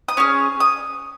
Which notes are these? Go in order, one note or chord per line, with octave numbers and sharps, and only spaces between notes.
D#6
C#4 G#4 F6
D#6